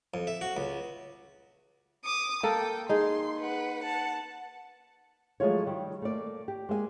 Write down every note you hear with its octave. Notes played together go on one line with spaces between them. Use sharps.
F2
E5
F#4
C#2
D6 D#6
A#3 A4 G5
D#4 G#4 C6
B4 F#5
F#5 A5
F3 F#3 G#3 A3 F4 C#5
D#3 G3
A3 A#3 D5
G4
G#3 A#3 E5 G#5